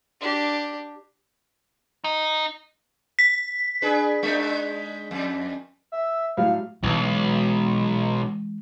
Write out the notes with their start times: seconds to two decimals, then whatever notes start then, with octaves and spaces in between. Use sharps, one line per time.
0.20 D4 G4
2.04 D#4
3.19 B6
3.82 D4 G#4 B4
4.23 G#3 D4 D#4
5.11 F2
5.92 E5
6.37 A2 F#3 G3 F5
6.84 B1 E3 G#3